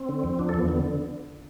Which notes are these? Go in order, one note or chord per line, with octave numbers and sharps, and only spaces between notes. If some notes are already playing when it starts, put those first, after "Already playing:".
Already playing: C4
D3
F2
F3 D4
A4
E2 B3
D3 B3